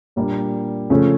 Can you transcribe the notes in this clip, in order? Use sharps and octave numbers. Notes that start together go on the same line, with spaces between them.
A#2 G3 A#3 D4
C#3 F3 A3 C#4